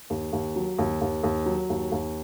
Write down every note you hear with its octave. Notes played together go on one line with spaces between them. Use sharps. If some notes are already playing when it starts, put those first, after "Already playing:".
D#2
D#2
F#3
D#2
D#2
D#2
F#3
D#2
D#2